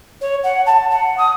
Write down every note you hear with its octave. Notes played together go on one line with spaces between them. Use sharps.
C#5
F#5
A5
F#5
D#6